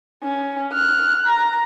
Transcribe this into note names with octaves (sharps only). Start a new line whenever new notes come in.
C#4
F6 F#6
A#5